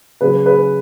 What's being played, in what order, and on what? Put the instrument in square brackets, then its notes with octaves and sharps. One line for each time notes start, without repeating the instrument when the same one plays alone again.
[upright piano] C#3 F#3 G#4 B4
G#4 B4